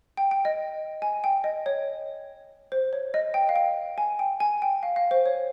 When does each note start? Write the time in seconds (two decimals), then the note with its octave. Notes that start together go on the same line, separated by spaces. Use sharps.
0.17 G5
0.31 G5
0.45 D#5
1.02 G#5
1.24 G5
1.44 D#5
1.66 C#5
2.72 C5
2.93 C#5
3.14 D#5
3.34 G5
3.49 F5
3.56 G5
3.98 G#5
4.19 G5
4.40 G#5
4.62 G5
4.83 F5
4.96 F5
5.11 C5
5.26 C#5